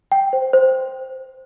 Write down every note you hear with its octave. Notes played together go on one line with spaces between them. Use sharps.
G5
C5
C5